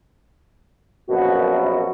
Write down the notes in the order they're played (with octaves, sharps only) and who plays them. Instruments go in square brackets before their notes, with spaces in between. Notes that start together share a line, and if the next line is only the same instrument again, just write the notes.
[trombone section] A#1 F#2 B2 [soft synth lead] F#4